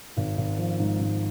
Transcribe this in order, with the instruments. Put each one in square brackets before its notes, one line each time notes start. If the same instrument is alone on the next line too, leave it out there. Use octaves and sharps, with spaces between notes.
[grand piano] G#1
G#1
F3
G#2
G#2